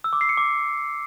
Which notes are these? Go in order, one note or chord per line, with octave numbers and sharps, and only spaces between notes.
E6
D6
C7
C#7
D6